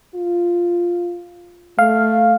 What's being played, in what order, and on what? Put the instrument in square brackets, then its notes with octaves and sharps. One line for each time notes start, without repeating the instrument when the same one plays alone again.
[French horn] F4
[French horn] A3 [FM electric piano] F5